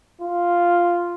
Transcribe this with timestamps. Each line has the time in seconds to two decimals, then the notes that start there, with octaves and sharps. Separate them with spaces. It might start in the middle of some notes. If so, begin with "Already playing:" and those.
0.22 F4